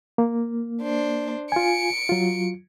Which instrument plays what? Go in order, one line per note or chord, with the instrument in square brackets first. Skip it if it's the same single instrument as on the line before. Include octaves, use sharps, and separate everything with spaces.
[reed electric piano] A#3
[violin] D4 C5
[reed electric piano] F4 G#5 [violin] C#7 D7
[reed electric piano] F#3 F4